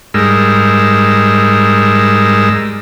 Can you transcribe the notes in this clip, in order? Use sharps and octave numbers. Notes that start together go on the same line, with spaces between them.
G#2 G3 G#3 A#4 E6